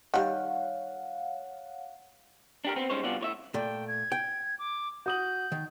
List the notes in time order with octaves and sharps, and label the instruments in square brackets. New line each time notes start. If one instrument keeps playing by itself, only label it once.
[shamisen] D#3 G3 [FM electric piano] C#5 F5 F#5
[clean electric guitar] D4 G4 A#4
B3 C4
G3 G#3 C#4 D#4 C5 C#5
G2 C3 B3 F4 F#4 D5
A2 C#5 E5
[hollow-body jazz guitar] A#2 A3 [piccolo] G5
[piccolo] G#6
[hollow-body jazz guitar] G5
[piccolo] D6
[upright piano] F#4 D#6 F#7 [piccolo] G6
[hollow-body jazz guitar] D#3